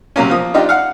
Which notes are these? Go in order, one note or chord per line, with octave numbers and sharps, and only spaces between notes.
C3 F#3 A#3 C#4
F3 A#3 D#6
D4 D#4 F4 G4
F5 F#5